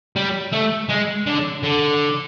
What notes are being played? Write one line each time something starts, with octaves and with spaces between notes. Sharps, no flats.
G3
A3
G#3
D3
D3